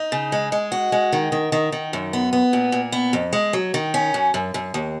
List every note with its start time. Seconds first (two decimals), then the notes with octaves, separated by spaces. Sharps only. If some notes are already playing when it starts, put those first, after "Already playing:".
Already playing: D#4
0.12 C#3
0.32 G#3
0.52 G#3
0.72 F#4
0.92 G#3
1.12 D#3
1.32 D#3
1.52 D#3
1.72 D#3
1.93 F#2
2.13 B3
2.33 B3
2.53 A#2
2.72 A#2
2.92 B3
3.13 F2
3.33 G#3
3.53 F#3
3.74 D#3
3.94 C#4
4.14 F#2
4.34 F#2
4.54 F#2
4.74 D#2